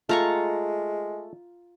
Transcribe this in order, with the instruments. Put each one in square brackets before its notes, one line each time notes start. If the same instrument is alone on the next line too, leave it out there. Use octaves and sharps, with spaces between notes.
[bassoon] G#3 [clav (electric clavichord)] A3 [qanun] F4 A#5 C#6